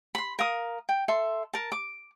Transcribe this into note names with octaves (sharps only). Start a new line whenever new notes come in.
B5 C6
A#4 F5 D#6
G5
A4 E5 C6
A#4 A5
D6